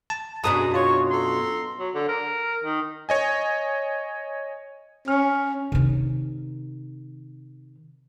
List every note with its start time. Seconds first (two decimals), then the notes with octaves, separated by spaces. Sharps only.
0.10 A5
0.44 F#2 B2 D4 G#4 A5 A#5 D#6
0.74 F4 C#5
1.10 A4 A#5 C6
1.79 F#3
1.95 D3
2.09 A#4
2.64 D#3
3.09 C#5 D#5 G#5
5.08 C#4 F6
5.72 C3 D#3